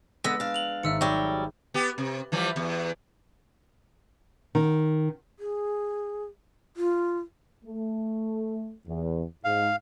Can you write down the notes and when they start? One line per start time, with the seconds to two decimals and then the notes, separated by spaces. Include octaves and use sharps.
0.24 D3 G#3 B3 B4 E6 A#6 B6
0.40 D4 F5
0.54 F7 F#7
0.83 G#1 D#4 E5 E6 C#7
1.01 F#3 G3
1.74 B3 G4
1.98 C3
2.32 E3 F3 G3
2.56 E2
4.55 D#3
5.39 G#4
6.77 F4
7.65 A3
8.87 E2
9.44 G#2 F5